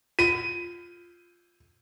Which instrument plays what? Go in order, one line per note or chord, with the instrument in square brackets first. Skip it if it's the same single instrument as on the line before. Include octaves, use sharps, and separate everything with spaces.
[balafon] F4 [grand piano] D#7